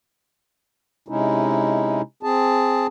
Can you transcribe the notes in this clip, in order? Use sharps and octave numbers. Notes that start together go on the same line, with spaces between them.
C3 G#3 C#4 D#4 E4
C4 G#4 A5